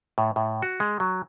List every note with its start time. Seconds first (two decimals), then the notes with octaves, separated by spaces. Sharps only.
0.18 A2
0.36 A2
0.62 F#4
0.80 G#3
1.00 F#3